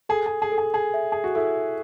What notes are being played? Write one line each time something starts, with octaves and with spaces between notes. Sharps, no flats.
G#4 A4
G#4
G#4
A4
G#4
G#4
E5
G#4
F#4
E4 A4